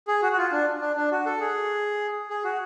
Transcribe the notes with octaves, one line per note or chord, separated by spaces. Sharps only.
G#4
F#4
F#4
F4
D4
D4
D4
F#4
A4
G#4
G#4
F#4